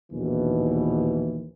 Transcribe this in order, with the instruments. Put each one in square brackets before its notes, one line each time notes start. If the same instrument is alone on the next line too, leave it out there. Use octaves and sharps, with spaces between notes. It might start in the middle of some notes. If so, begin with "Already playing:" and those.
[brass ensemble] A#1 D#2 B2 E3